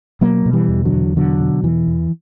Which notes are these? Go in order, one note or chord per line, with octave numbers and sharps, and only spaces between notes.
B2 F#3 A#3
B2
E3 G3
E2
D3 F#3
E2
B2 D3 F#3
B2
E2 E3
E2